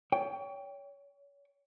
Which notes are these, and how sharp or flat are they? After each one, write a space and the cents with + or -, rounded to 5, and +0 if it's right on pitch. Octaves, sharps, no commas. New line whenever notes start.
C#5 +30 G5 +10